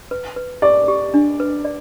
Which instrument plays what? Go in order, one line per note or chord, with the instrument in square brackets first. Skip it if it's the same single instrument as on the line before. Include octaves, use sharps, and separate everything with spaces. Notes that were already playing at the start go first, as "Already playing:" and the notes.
[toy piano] B4
B4
[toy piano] G4 [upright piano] D5
[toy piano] G4
D4
B4
D5